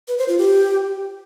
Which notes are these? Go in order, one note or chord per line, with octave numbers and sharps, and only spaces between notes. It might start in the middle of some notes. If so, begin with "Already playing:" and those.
B4
C5
F4
G4